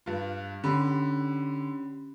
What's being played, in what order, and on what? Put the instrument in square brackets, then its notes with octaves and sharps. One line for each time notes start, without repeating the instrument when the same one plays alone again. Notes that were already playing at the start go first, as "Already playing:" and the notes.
[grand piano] G2 F4
[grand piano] D3 [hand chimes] C#4 G4 B5